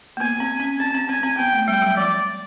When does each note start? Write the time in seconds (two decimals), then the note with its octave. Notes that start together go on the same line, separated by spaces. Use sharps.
0.17 A#3
0.20 B3 G#5
0.40 C4
0.60 C#4
0.80 C4 A5
0.95 C4
1.09 C4 G#5
1.23 C4
1.38 B3 G5
1.53 A3
1.68 G3 G5
1.82 F#3
1.97 F3 D5